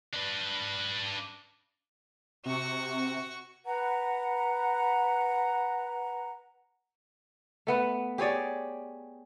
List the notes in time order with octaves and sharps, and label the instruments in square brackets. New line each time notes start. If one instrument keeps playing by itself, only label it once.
[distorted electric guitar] D4 B4
[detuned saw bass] C3 [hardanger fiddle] F#4 C#6
[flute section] B4 F#5 A#5
[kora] A3 B3 B4
G4 G#4 C#5 D5